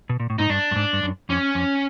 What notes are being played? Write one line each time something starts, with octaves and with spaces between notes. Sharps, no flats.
B2
A#2
A2
G#2 D#4
G2 D4
G2
G#2
G2
F#2
F2 C#4
F2